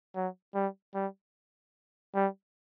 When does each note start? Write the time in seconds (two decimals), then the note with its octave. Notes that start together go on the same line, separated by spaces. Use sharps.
0.16 F#3
0.55 G3
0.94 G3
2.15 G3